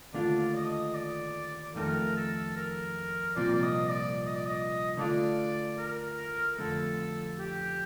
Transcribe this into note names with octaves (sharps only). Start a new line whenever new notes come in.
D#2 D3 A3 D4 F4 D5
D#5
D5
F2 D#3 A3 A#4
A4
A#4
C2 A#2 F3 C4 D5
D5
D#5
D5
D#5
D5
D#5
D3 A3 D4 F4 D5
A#4
F2 D3 A3 A4
G4